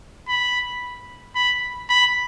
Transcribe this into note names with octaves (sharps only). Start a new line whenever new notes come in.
B5
B5
B5